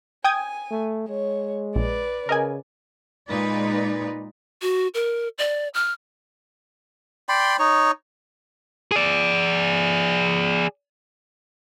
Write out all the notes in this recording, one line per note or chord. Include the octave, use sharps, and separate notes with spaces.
G5 G#5 D#6 G#6
A3
G#3 C#5
A#1 B4 D5
C#3 A#4 D#5 G#5
A#2 G#3 D#4 B4 D5
F#4
A#4
D5
F6
D5 G5 B5 C6
D#4 C#5
G#4 D5